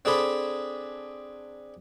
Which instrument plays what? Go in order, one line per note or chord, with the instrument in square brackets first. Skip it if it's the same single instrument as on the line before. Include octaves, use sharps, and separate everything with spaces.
[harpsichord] C4 D4 G#4 A4 B5